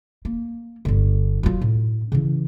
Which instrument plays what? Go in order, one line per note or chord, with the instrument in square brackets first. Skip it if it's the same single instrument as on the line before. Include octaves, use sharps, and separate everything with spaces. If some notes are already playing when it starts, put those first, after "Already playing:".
[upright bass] A#3
G1 D3
F#3 F4
A2
C#3 E3